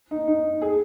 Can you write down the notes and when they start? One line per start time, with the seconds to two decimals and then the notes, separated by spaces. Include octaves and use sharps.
0.11 D#4
0.28 D#4
0.62 G#4